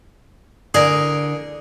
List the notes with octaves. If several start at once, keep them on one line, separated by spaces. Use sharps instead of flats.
D3 E4 G#4 A#4 D5